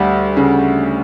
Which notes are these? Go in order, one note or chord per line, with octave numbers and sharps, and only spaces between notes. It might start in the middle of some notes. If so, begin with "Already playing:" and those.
Already playing: D2 G3
C#3